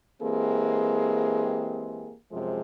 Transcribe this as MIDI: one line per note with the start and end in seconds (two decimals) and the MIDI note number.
0.22 2.13 52
0.22 2.13 56
0.22 2.13 58
0.22 2.13 60
0.22 2.13 67
0.22 2.13 68
2.31 2.61 42
2.31 2.61 48
2.31 2.61 53
2.31 2.61 56